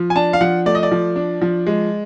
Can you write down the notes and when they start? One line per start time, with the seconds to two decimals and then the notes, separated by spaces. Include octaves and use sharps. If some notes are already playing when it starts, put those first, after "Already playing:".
Already playing: F3
0.10 G#5
0.16 D4 A5
0.33 F5
0.41 F3 F#5
0.66 A3 D5
0.75 D#5
0.83 D5
0.91 F3
1.16 D4
1.41 F3
1.66 G#3